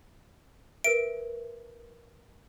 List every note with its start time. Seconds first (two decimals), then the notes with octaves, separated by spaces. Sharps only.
0.84 A#4 B4 E5 D7